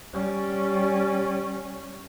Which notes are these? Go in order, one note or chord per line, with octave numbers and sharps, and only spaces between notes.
G3 C#4